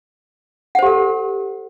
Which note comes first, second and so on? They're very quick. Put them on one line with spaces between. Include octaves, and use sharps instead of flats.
F#5 C5 G4 A4